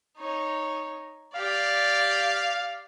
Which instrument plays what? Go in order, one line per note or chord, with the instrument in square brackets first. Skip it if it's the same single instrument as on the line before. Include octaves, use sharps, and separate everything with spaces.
[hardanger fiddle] D#4 C#5
[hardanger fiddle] G4 D5 [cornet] F5